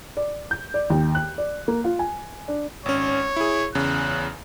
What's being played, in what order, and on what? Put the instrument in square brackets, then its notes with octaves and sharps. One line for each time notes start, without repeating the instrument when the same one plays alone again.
[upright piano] D5
G6
D5
D#2
F#6
D5
A#3
F4
G#5
D4
[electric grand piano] G#1 C#4 [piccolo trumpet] C#5
[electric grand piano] E4 G#4
[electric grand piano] E2 C#3 [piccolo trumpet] F#6